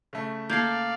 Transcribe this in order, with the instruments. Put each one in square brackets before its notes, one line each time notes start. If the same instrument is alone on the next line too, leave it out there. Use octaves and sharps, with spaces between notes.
[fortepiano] C#3 A3
[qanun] A#3 A4 [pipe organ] D5 F5 [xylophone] G6 G#6 C7